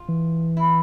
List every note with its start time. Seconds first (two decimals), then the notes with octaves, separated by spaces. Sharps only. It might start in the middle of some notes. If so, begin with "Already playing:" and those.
Already playing: F4
0.09 E3
0.57 E4